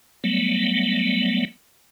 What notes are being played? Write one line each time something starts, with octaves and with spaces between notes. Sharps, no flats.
F#3 G3 A3 B3